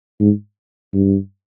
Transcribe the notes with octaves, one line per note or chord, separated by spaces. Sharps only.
G#2
G2